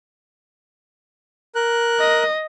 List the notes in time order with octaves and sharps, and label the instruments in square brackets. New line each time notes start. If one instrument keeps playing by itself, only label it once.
[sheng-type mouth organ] A#4 F#6
[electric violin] D#5